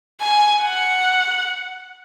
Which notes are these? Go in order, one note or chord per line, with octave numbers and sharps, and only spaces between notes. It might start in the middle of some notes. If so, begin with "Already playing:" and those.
G#5
F#5